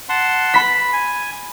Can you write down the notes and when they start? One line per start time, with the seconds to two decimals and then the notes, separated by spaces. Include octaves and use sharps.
0.09 F#5 A5 C6
0.54 B5 B6
0.93 G#5